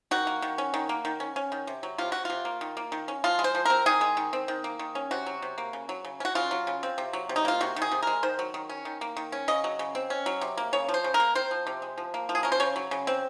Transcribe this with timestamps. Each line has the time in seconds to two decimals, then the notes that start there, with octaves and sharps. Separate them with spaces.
0.11 D#3 F#4
0.27 A#3
0.42 D#3
0.58 C#4
0.74 D#3
0.89 A#3
1.05 D#3
1.20 C#4
1.36 C#4
1.52 D#3
1.67 C3
1.83 F#3
1.98 C3 F4
2.12 F#3 F#4
2.25 C3 F4
2.45 A#3
2.61 D#3
2.77 A#3
2.92 D#3
3.08 C#4
3.24 F3 F4
3.39 G#3
3.44 C5
3.55 F3
3.65 C4 A#4
3.86 D#3 G#4
4.01 G#3
4.17 D#3
4.33 C4
4.48 D#3
4.64 A#3
4.79 D#3
4.95 C#4
5.11 C3 F#4
5.26 F#3
5.42 C3
5.58 A#3
5.73 C#3
5.89 F#3
6.05 C#3
6.20 C#4
6.25 F#4
6.35 C#3 F4
6.51 F#3
6.67 C#3
6.83 C4
6.98 C3
7.13 F#3
7.29 C3
7.36 D#4
7.45 A#3 F4
7.61 C3 F#4
7.76 D#3
7.82 G#4
7.92 C3
8.03 G#3 A#4
8.23 D#3 C5
8.39 F#3
8.54 D#3
8.69 C#4
8.85 D#3
9.01 A#3
9.17 D#3
9.32 C#4
9.48 C#3 D#5
9.64 F#3
9.79 C#3
9.95 C4
10.10 C#4
10.26 F#3
10.41 C3
10.58 A#3
10.73 C#3 C#5
10.89 F3
10.94 C5
11.04 C#3
11.14 A#4
11.20 A#3
11.35 C4 C5
11.51 F3
11.67 C3
11.82 G#3
11.98 F3
12.14 A#3
12.29 F3
12.35 G#4
12.43 C#4 A#4
12.52 C5
12.60 C#3 C#5
12.76 F#3
12.91 C#3
13.07 C4